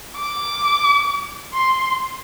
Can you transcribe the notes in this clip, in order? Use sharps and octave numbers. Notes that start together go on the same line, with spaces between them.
D6
C6